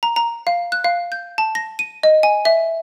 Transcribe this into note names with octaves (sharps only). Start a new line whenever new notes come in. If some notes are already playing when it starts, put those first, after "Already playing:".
A#5
A#5
F5
F#6
F5
G6
A5
A#6
D#7
D#5
G#5
E5